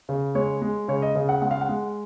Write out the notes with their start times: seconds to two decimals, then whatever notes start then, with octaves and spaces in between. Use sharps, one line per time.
0.09 C#3
0.35 G#3 C#5
0.62 G#3
0.88 C#3 C#5
1.02 D#5
1.15 C#3
1.29 F#5
1.42 G#3 F#5
1.51 F5
1.61 F#5
1.69 G#3